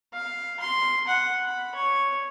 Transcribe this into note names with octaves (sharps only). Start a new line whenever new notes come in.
F5
C6
F#5
B5
C#5